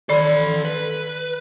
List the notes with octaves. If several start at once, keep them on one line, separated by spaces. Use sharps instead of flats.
D#3 A4 D5 B5 C6
B4